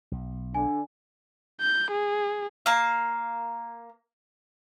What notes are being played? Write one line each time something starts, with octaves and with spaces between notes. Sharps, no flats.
B1
D3 G#5
G6
G#4
A#3 F5